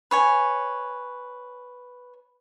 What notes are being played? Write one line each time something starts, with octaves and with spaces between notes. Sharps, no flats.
B4 C#5 G#5